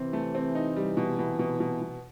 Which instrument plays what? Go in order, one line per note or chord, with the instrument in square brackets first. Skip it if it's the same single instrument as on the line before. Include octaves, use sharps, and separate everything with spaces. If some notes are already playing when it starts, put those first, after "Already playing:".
Already playing: [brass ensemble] C3 E3 [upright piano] C4
[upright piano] A3
C4
D#4
G3
B2
B2
B2
B2
B2